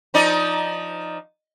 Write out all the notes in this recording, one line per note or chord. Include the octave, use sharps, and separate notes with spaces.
F3 D#4 D5